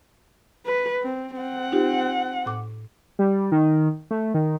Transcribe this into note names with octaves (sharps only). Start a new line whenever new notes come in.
B4
C4
C4 F#5
D#4 F4 G4
A2 D6
G3
D#3
A3
D#3